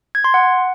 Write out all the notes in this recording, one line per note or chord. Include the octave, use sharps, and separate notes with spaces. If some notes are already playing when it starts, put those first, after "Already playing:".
G#6
C6
F#5